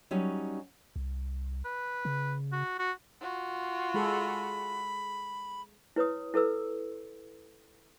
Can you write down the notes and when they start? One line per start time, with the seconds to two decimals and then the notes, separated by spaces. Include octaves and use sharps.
0.11 F#3 G3 C#4 D#4
0.96 C2
1.65 B4
2.05 C#3
2.52 F#4
2.79 F#4
3.21 F4 F#4
3.94 G#3 G#4 A4 B5
5.96 E4 B4 C#5 D#6
6.34 E4 A4 B4 E6